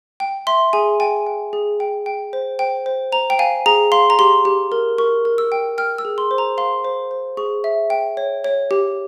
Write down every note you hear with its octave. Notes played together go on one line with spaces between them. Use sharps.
G5
E5 C6
G#4 G#5
G5 G#5
G5
G#4
G5
G5
C5
C5 G5
C5
C5 A#5
G5
F5 G#5
G#4 A#5
F5 C6
A#5
G4 C6
G4
A#4
A#4 C#6
A#4
E6
G5
G5 F6
E6
G#4
C6
C5
A#5
F5 C6
C5
C5
G#4 C#6
E5
G5
C#5
C#5
G4